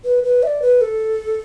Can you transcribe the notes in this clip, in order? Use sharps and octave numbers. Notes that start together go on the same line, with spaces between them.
B4
B4
E5
D5
B4
A4